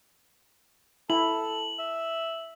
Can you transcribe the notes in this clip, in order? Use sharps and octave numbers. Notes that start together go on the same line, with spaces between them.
E4 A4 F#7
E5